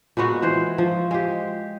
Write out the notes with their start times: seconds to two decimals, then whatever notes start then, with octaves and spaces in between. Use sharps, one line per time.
0.17 A#2 G#3 B3 F#4
0.42 E3 C5
0.78 F3
1.11 G#3 G4